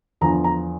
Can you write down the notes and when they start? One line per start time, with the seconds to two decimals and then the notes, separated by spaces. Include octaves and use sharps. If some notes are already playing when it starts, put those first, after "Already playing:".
0.21 E2 D3 F3 A#5
0.44 A#5